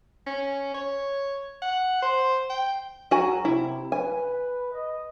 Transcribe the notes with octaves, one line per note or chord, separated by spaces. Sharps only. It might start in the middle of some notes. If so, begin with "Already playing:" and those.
C#4
C#5
F#5
C5
G5
C#2 F#3 F#4 G#5 A#5
C3 E4
B4 G#5
D#5